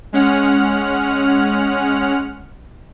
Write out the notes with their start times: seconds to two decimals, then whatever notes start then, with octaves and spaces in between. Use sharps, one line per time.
0.13 G#3 C#4 F#5 F6